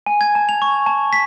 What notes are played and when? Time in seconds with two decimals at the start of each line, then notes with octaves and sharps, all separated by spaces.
0.06 G#5
0.21 G#6
0.35 A5
0.49 F7
0.62 C#6
0.86 A5
1.13 B6